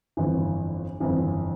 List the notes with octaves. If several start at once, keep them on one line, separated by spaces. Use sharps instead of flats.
G1 F2 E3
G1 F2 E3